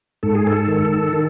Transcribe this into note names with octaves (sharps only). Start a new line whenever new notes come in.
G#2 A4
G#4
A4
D#3
D#3